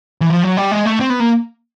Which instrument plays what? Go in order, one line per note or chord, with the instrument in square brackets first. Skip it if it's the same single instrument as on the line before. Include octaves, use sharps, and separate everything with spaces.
[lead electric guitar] E3
F3
F#3
G3
G#3
A3
C4
B3
A#3